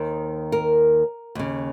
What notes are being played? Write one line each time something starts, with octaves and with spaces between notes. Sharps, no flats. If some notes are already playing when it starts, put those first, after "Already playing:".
Already playing: D#2 D#3 C5
A#4
D#2 C#3